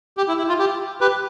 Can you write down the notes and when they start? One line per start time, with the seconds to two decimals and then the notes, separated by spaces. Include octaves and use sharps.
0.17 G4
0.28 E4
0.38 E4
0.48 F4
0.59 G4
1.01 G4 B4